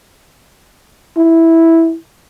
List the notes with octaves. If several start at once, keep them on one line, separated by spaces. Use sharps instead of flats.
E4